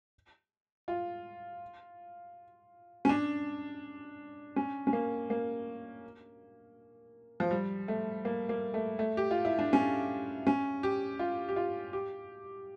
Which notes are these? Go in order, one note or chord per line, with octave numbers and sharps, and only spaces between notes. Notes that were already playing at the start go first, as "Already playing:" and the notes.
F4
C#4
D4
C#4
C#4
A#3
A#3
F3
G3
A3
A#3
A#3
A3
A3
G4
F4
E4
D4
C#4
C#4
G4
F4
G4
F4
G4